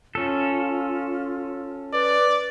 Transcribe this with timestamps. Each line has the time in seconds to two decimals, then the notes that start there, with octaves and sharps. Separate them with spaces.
0.15 C#4 F4 A4
1.93 B4 D5